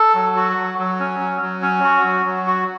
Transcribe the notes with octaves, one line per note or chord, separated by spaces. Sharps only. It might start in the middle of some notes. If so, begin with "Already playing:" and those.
Already playing: A4
F#3
F#4
F#3
F#3
C#4
F#3
F#3
C#4
F#4
F#3
F#3
F#4